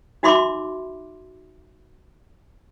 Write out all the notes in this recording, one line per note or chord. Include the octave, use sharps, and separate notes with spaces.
D#4 F#4 E5 B5 C6 D6